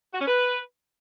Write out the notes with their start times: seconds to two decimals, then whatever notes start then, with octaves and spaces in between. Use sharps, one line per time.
0.14 F#4
0.21 C#4
0.28 B4